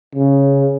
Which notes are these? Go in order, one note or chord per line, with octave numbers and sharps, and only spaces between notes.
C#3